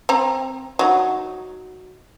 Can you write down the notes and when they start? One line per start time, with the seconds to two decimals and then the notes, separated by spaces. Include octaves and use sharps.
0.09 C4 A#5
0.79 F#3 D#4